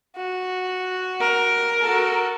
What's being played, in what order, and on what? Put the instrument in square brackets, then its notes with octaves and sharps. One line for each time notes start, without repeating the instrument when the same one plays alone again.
[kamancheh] F#4
[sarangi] A#4
[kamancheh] F#4 A4